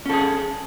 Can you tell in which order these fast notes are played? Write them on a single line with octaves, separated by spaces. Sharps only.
C#4 A4 G#4